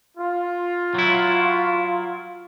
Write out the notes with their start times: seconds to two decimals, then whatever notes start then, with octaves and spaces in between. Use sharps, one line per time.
0.18 F4
0.95 F#3 E4